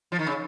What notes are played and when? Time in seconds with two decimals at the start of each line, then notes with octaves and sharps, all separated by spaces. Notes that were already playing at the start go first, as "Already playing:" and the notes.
0.12 F3
0.19 D#3
0.27 C#3